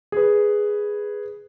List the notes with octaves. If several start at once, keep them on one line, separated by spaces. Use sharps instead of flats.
G#4 B4